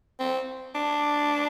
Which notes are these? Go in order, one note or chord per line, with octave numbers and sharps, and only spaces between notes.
C4
D4